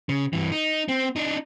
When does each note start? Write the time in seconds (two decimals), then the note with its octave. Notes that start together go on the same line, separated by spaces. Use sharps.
0.09 C#3
0.33 G2 E3
0.52 D#4
0.88 C4
1.16 D4 D#4